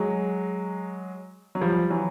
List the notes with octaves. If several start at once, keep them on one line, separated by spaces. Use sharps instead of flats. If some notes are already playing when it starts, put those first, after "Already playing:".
Already playing: F#3 G#3
F#3
F3 G3
E3 F#3